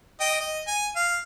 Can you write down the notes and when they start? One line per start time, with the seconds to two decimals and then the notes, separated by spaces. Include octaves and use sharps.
0.20 D#5 G5 D#6
0.40 D#5
0.67 G#5
0.96 F5